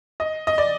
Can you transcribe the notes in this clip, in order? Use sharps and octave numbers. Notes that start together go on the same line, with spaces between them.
D#5
D#5
D5